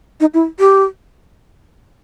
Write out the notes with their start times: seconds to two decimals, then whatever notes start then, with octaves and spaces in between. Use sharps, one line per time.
0.20 D#4
0.34 E4
0.59 G4